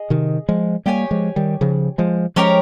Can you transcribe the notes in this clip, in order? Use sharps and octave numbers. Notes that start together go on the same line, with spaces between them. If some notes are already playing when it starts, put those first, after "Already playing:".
Already playing: G#4 D#5
C3 D#3
F3 G#3
G3 A#3 G4 C#5 G#5
F3 G#3
D#3 G3
C#3 F3
F3 G#3
F3 G#3 C#4 G4 A#4 C#5